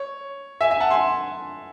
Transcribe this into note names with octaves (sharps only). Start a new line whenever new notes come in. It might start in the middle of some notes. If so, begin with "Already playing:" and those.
Already playing: C#5
E5 G#5
E5 G#5
F#5 A5
G#5 C6